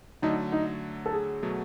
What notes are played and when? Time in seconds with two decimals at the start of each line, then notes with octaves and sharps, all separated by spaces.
0.22 D3 F#3 A3 D#4
0.52 D#4
1.06 A4
1.13 G#4
1.43 B2 F#3 A3